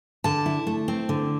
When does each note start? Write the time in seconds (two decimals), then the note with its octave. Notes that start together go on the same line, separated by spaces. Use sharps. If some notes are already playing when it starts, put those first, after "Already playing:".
0.24 D3 A5
0.46 E4
0.67 A3
0.88 C4
1.09 D3